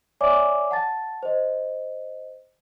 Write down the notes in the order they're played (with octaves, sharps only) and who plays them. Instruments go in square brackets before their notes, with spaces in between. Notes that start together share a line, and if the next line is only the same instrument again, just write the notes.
[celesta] C#5 D5 E5 G#5 D6
F#5 A5 A6
C5 D#5